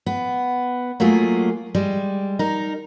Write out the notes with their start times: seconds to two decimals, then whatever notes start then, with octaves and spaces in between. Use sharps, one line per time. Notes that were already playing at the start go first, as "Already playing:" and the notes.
0.06 B3
1.00 F#3 A3 A#3 F4 G#4
1.74 G3 G#3
2.39 D#4 A#4